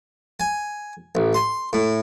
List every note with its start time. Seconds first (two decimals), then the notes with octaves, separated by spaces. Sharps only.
0.40 G#5
1.15 A1
1.34 C6
1.73 A2